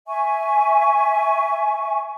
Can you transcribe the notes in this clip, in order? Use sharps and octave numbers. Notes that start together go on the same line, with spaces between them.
E5 G#5 C#6